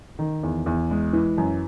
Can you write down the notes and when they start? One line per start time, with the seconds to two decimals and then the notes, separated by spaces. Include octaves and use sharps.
0.19 D#3
0.43 E2
0.66 E2
0.91 G#3
1.13 E3
1.38 F#2